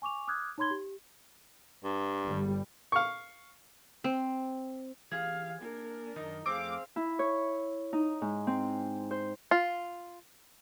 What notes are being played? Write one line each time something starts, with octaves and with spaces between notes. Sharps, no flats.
G#5 C#6 D6 F7
D6 D#6 F6 F#6 G#6
D#4 C#5 B5 C6 G#6 G7
G4
G2
G1 G3
F5 C#6
C4
E3 G4 G#4 F5
A#3 D4 A#4
F#2 D#3 D#4
F2 A3 C4 G#4 F5 D6
E4
C#5
D#4
G#2
C4
C5
F4